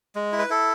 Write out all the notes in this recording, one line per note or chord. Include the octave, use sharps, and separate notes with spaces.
G#3
E4
B4
E4 A4